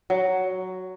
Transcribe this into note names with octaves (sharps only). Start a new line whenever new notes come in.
F#3